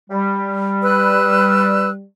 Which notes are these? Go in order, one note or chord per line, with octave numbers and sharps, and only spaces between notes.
G3
B4 E6 F#6